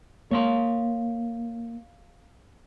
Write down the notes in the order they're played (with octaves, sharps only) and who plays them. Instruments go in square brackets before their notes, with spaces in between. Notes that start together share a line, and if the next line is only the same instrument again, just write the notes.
[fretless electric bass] A#3 [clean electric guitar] C#5 F5 C6